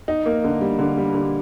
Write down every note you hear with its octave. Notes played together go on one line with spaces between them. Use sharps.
D#4
A#3
D3
G3
D3
G3
D3